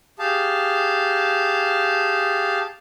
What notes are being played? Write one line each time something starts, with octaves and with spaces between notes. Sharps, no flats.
G4 G#4 F5 A5